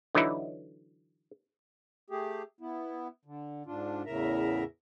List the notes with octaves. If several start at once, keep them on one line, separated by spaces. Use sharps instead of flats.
D3 E3 F#3 D#4 E4
A3 G4 G#4
B3 E4
D3
G#2 D4 F4
E2 A2 C#3 A#4 E5 A#5